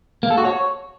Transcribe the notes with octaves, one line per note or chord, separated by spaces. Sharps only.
A#3
A4
F#4
C#5